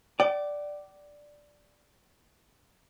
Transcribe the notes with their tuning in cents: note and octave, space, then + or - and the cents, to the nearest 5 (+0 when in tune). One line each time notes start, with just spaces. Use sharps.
D5 +0 G5 -45